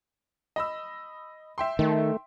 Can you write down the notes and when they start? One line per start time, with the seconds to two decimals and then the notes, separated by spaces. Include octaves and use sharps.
0.56 D#5 B5 E6
1.58 E5 G5 C6
1.79 D#3 A3